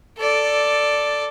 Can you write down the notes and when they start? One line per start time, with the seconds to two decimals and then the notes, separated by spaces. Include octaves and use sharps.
0.18 A4 D5